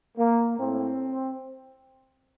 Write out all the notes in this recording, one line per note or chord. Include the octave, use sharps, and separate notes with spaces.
A#3
A2 C4